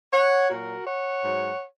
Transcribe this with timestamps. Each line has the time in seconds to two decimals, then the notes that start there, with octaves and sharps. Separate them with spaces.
0.12 C#5 F#5
0.49 A#2 F#3 F#4 A#4
0.86 C#5 F#5
1.23 G#2 F#3